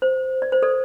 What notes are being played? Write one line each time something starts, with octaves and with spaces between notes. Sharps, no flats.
C5
D5
C5
A4 D5